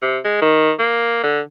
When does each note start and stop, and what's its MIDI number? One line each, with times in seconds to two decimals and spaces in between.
0.02 0.18 48
0.24 0.40 56
0.41 0.71 51
0.79 1.21 58
1.23 1.40 50